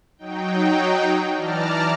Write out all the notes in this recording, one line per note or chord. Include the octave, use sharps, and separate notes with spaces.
F#3 D#4 G5
E3 D5 A5 A#5 F6